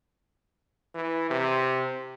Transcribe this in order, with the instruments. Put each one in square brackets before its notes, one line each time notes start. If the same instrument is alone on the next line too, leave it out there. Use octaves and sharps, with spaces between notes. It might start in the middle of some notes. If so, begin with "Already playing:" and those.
[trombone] E3
C3